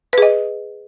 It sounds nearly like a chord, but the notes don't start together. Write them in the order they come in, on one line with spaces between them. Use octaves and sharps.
B4 G#4 D#5